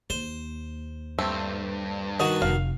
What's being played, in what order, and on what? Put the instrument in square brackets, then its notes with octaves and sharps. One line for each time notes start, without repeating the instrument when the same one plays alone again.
[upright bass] D#2 [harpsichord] C5
[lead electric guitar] G2 [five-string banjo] A3 C4
[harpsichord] D#3 F#4 [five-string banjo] D#5
[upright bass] F1 [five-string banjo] F5